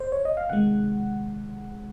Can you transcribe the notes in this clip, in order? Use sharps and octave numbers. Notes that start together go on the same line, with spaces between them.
C5
C#5
D#5
F5
C3 D#3 G#3 F#5